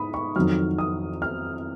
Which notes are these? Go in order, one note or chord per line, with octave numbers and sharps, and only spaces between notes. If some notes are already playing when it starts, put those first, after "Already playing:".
Already playing: G#2 B5 D#6
C#6
F2 D#3 F#3 F6
D#6
F6